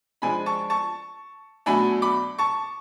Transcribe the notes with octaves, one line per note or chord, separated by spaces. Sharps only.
F3 G#3 D4 G#5 B5
A5 C#6
A5 C#6
B2 F#3 A3 D4 G#5 B5
B5 D6
A5 C#6